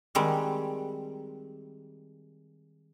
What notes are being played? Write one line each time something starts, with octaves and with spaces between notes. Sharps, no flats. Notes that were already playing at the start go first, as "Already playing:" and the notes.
D#3 G3 G#3 C4 G4 F#5